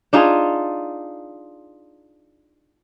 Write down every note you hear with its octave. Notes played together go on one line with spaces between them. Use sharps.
D4 D#4 F4 G#4